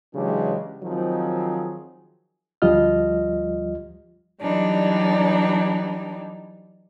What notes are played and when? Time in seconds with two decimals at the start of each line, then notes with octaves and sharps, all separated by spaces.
0.14 C#3 E3 F#3 G#3 D4 G4
0.83 D#3 F3 F#3 C4 D#4 G#4
2.62 D2 F3 G3 F4 D#5 F6
4.41 E3 F#3 G3 D4 D#4